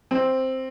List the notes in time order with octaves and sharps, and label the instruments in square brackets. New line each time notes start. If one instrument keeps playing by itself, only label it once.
[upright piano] C4